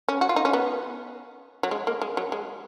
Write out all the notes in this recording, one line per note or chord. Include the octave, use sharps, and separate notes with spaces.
C#4
F#4
F4
D#4
C#4
B3
F#3
G#3
A#3
G#3
F#3
G#3